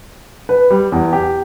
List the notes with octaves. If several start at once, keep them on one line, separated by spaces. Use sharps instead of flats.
B4
G3
E2
G4